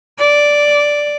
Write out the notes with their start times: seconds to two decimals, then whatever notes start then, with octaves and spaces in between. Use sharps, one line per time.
0.18 D5